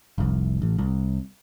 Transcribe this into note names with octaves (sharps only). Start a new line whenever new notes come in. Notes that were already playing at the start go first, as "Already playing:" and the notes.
F1 C2
A1
C2